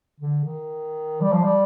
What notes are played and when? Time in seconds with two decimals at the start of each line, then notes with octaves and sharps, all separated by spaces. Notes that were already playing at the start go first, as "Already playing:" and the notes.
0.20 D3
0.45 D#3
1.21 G3
1.33 F3
1.44 G3